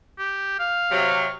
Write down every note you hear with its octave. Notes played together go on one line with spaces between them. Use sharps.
G4
F5
C3 F#3